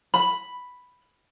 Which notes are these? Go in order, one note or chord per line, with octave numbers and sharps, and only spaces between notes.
B5